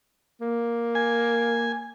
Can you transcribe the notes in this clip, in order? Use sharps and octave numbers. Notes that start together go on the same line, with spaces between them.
A#3
G#5